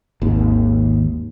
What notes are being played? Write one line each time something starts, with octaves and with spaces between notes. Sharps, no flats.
G#1 D#2